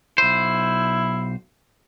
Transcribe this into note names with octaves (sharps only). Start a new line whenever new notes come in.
B1 E4 C5